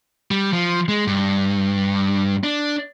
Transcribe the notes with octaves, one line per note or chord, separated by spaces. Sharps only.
G3
F3
G#3
G2
D4